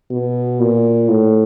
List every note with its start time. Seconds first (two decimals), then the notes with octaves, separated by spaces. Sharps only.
0.11 B2
0.60 A#2
1.09 A2